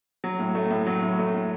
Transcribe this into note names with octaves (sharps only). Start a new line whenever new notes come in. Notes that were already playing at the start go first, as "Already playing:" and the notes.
F#3
A2
A3
A2
F#3
A2
A3
A2